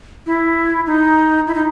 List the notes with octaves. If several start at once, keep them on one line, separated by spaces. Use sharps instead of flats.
E4
D#4
E4
D#4